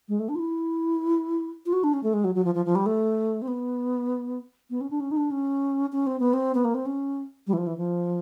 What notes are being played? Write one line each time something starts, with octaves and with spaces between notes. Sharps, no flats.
G#3
A3
D4
F4
E4
F4
F#4
D4
C#4
A3
G#3
F#3
F#3
F3
F3
F3
G3
A3
C4
B3
B3
C#4
D4
C#4
D#4
D4
C#4
C#4
C4
B3
C4
B3
A#3
C4
C#4
G3
E3
F3
E3
F3